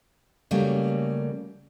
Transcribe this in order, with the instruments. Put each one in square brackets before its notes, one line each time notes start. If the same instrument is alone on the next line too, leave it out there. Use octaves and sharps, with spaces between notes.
[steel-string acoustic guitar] C#3 F#3 G3 A3 A#3